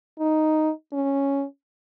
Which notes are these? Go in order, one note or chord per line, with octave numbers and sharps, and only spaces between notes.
D#4
C#4